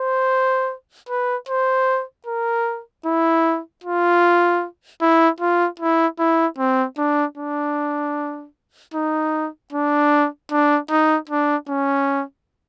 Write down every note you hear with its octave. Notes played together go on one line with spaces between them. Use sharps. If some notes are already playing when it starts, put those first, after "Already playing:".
Already playing: C5
B4
C5
A#4
E4
F4
E4
F4
E4
E4
C4
D4
D4
D#4
D4
D4
D#4
D4
C#4